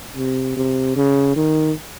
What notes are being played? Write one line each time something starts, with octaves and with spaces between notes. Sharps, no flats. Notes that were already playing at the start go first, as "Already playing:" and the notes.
C3
C3
C#3
D#3